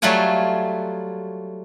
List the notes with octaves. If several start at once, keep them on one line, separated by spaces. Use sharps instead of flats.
F#3 G3 A3 F4 F#5 G#5